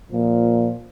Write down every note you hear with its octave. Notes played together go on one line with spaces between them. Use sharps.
A#2 F3